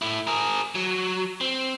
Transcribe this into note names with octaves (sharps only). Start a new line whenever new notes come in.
A3 E4
G#4 A#4
F#3
C4